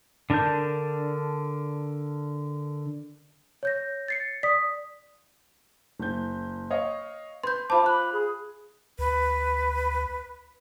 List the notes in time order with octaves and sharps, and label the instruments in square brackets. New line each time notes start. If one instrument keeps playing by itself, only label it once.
[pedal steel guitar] D3 D4 A#4 A5 G6
[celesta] C#5 G6 A#6
[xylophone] A6 C7 C#7
[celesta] D5 [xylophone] D#6 B6
[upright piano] F#1 G6
C#5 D#5 F5
[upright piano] B4 [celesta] C6 G6
[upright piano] F4 C5 [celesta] A5 B5 [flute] D6
[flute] B5 [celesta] F#6
[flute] G#4
[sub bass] D2 [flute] B4